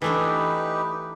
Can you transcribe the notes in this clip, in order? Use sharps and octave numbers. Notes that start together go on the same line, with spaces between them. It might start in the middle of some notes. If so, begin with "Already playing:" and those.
E3 A3 D4 D#4 G4 B4